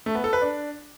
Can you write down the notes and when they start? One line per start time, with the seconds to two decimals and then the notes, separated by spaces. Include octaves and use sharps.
0.06 A3
0.15 B3
0.24 A4
0.33 B4
0.42 D4